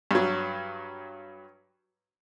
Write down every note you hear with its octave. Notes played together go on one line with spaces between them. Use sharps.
G2 F#3